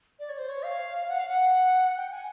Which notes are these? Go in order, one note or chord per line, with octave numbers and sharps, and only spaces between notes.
D5
C#5
C5
C#5
F5
F#5
F5
F#5
G5
G#5